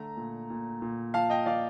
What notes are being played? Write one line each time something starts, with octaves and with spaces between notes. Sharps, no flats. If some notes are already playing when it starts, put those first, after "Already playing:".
Already playing: D3 A3 A#5
A#2
A#2
A#2
F3 F5 A5
D#5 G5
F3 D5 F5